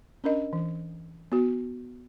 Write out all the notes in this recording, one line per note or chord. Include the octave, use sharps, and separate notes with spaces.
C#4 D4 A#4 D#5
E3
B3 F#4